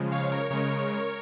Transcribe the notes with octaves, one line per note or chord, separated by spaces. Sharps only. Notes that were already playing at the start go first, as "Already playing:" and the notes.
Already playing: C#3 F3 G#3
C#5 F5
A#4 C#5
C#3 G#3 A#4 C#5